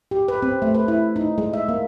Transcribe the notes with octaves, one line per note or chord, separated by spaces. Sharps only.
G4
B4
C4
A3
B4
E4
D#4
G#3
E5
A#3